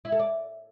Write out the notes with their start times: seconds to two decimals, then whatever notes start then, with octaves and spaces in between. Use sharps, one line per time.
0.05 E4
0.12 A4
0.19 D5